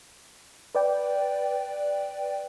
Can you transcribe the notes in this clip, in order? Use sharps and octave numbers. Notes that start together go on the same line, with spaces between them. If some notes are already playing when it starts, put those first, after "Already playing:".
B4 D5 G5